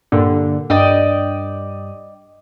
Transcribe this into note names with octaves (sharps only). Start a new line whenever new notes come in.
G2 A#2 D3
G2 D5 D#5 G5